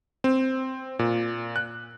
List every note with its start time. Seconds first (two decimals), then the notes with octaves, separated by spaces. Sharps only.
0.24 C4
0.99 A#2
1.56 F#6